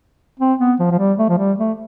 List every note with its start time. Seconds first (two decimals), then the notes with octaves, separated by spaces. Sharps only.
0.40 C4
0.59 B3
0.80 F3
0.91 F3
0.99 G3
1.19 A3
1.29 F3
1.39 G3
1.59 A3